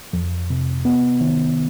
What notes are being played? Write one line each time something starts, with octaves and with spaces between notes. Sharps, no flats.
F2
C3
B3
D#3